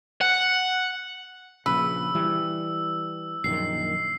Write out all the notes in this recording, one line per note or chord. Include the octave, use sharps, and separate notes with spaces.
F#5
A#1 C#3 B4 E6
E3 G3
A#1 F#2 D#3 C7